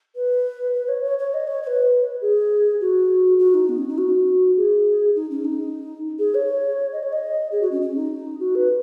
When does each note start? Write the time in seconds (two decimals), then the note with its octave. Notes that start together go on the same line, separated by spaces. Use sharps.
0.15 B4
0.73 B4
0.88 C#5
1.03 C#5
1.18 C#5
1.33 D#5
1.47 C#5
1.63 C#5
1.66 B4
2.21 G#4
2.80 F#4
3.38 F#4
3.54 D#4
3.69 B3
3.78 C#4
3.88 D#4
3.97 F#4
4.56 G#4
5.15 D#4
5.30 C#4
5.44 D#4
6.18 G#4
6.34 C#5
6.92 D#5
7.03 C#5
7.12 D#5
7.51 G#4
7.61 F#4
7.71 C#4
7.81 C#4
7.95 D#4
8.39 F#4
8.55 B4